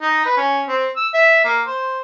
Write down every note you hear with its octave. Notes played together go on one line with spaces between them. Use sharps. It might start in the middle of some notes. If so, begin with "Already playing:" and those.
D#4
B4
C#4
C4
E6
E5
A#3
C5